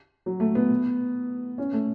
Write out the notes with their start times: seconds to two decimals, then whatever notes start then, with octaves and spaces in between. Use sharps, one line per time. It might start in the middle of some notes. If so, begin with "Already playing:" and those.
0.26 F#3
0.40 A3
0.55 B3
1.58 C#4
1.73 A3